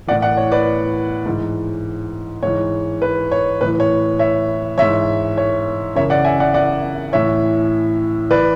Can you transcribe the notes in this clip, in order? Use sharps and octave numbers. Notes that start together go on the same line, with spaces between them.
A2 E3 D5 F#5
D5 F#5
C#5
B4 D5
G#2 E3
G#2 E3 C#5
B4
C#5
A2 E3 B4
C#5
C#5 E5
G#2 E3 C#5 E5
C#5
F#2 C#3 E3 C#5 E5
D5 F#5
E5 G#5
D5 F#5
D5 F#5
A2 E3 C#5 E5
E3 B4 D5